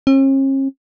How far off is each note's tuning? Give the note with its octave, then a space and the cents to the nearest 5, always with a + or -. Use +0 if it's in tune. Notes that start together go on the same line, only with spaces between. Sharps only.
C#4 -45